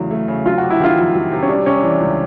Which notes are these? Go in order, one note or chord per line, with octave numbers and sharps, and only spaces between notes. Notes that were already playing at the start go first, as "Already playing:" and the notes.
Already playing: E2 C#3 F#3 A3
A3
C#3
F#3 F4
F#4
C3
E4
D#3 F4
F2
F#3
C3
C#4
G3 D4
C3 C#4
E3 D4
C#2